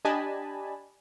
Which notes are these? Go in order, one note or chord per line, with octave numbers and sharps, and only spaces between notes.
D4 G4 D#5 G#5 A5 B5